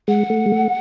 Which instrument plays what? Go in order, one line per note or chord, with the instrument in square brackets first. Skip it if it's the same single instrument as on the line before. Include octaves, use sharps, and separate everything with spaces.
[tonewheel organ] G#3 [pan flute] F#5
[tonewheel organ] A3
G#3
A3